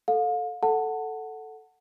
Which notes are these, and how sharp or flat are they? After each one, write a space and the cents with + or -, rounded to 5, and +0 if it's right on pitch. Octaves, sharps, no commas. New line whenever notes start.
A4 +0 F5 +35
A4 +0 F#5 +0 A5 +25